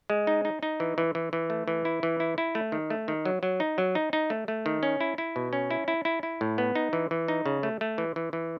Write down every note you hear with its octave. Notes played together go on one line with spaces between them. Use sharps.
G#3
D#4
D#4
D#4
E3
E3
E3
E3
A3
E3
E4
E3
E4
E4
A3
D#3
A3
D#3
F#3
F#3
D#4
F#3
D#4
D#4
A3
A3
D#3
C#4
E4
E4
B2
C#4
E4
E4
E4
E4
A2
B3
D#4
E3
E3
D#4
C#3
A3
A3
E3
E3
E3